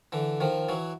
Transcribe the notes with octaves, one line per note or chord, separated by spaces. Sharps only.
D3 E3
D#3 F3
E3 F#3